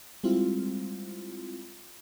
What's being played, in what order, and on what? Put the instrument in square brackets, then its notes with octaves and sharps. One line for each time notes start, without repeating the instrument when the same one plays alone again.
[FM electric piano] G3 G#3 C4 E4 F4